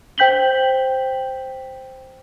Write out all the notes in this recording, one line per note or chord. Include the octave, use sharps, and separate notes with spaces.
C5 G5 G6 B6 F#7 G7